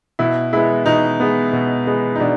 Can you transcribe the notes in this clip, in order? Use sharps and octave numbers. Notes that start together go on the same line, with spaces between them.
B2 E4
G#3 B3 E4
B2 D#4
G#3 B3
B2
G#3 B3
D#4
B2 D4